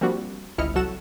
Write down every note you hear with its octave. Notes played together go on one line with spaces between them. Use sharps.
F3 G3 A#3 C4 D4 F#4
G1 C#2 E4 D#5 F6 C#7
C2 F#3 F#4 A4 F#5 E7